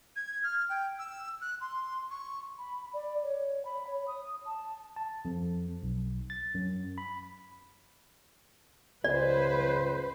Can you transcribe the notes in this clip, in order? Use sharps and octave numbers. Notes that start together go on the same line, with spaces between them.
G#6
F6
G5
E6
F#6
C6
C#6
B5
D5
C#5
B5
C#5
D#6
A5
A5
F2
B1
A6
F#2
B5
C#2 B4 C5 D5